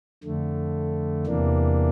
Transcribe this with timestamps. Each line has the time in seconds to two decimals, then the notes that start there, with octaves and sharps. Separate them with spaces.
0.23 F2 D3 A3
1.26 E2 C3 E3 A#3 D4